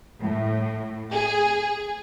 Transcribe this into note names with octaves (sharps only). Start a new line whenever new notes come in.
A2
G#4